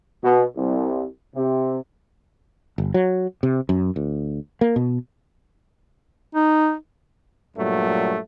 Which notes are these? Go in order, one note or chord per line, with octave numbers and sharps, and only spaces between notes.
B2
C2
C3
G1
F#3
C3
F#2
D2
A#3
B2
D#4
G2 A#2 F#3 A3